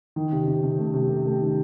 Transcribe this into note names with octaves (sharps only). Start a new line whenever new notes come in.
D#3
C3
C3
C3
A3
C3
A3
A3
D#3